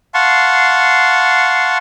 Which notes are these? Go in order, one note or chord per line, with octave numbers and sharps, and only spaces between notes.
F5 F#5 A5 C6 C#6